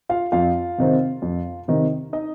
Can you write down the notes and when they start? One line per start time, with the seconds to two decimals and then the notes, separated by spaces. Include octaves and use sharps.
0.09 F4 F5
0.32 F2 F4 F5
0.78 C3 D#3 C4
1.22 F2
1.68 C3 D#3 C4
2.13 D#4 D#5